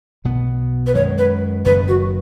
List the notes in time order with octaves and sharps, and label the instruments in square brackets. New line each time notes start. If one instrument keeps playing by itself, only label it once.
[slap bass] B1 B2 B3
[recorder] B4
[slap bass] F#2 D#3 G#3 [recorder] C#5
[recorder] B4
[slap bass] F#1 F#2 D#3 [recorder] B4
[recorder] F#4